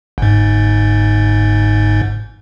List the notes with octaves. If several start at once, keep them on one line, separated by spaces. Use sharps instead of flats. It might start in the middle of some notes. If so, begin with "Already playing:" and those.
G1 G#2